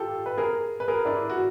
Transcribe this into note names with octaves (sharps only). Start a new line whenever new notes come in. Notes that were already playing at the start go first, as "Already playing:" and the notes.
Already playing: F4 G4 A4
B4
G#4 A#4
B4
G#4 A#4
D4 E4
F#4